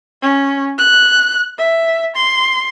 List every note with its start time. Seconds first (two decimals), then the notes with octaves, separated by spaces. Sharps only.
0.22 C#4
0.78 F#6
1.58 E5
2.16 C6